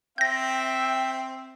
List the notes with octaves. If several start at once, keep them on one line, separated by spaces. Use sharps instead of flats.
C4 E5 G5 G6 A#6